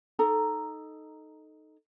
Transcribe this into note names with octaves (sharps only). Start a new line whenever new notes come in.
D#4 A4 A#5